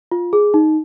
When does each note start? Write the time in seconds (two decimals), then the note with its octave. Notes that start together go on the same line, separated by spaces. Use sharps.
0.12 F4
0.33 G#4
0.54 D#4